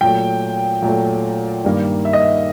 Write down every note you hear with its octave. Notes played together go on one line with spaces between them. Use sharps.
A#2 F#3 A3 G5
A#2 F#3 A3
G2 D#3 G3 A#3
E5
D#5
E5